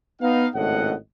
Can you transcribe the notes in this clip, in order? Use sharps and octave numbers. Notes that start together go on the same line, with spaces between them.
B3 D#4 F5
G#1 A2 C#3 A3 D#5 F#5